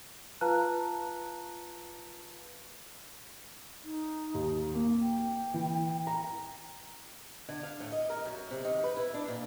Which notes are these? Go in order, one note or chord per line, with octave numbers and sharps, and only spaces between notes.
F4 B4 F5 A5 A#5 F#6
D#4
D#2
A#3
G5
E3
A#5
D3
F5
A2
D#5
A#4
F#2
C3
D#3
B4
E4
D4
A#2